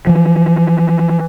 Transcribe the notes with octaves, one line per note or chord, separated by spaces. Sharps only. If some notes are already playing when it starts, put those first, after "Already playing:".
E3 F3